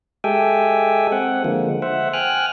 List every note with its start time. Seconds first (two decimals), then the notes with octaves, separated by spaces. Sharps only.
0.24 G#3 G4 A4 E5 G5 G#5
1.12 C4 F#5
1.45 D3 F3 G#3 A#3
1.82 C5 E5 F#5
2.13 G5 G#5 F6 F#6